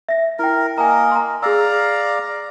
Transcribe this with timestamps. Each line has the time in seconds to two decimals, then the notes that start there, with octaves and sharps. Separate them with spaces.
0.09 E5 A#6
0.39 E4 A#4 G5
0.78 A#3 A#4 D#5 G#5 A#5
1.12 A#5 C6
1.43 G#4 D5 F5 A#5 E6